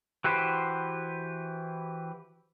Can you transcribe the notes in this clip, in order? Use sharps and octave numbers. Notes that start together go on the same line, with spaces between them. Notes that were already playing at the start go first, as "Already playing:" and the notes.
E3 F#4 G4 B4 C5